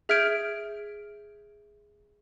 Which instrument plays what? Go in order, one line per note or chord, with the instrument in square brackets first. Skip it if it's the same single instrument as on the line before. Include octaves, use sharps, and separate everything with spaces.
[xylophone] G#4 E5 F6 G6 G#6 D7